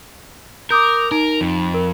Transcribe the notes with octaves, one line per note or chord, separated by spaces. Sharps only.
A#4 D6 D#6 G6
D#4 A#4
F2
A#4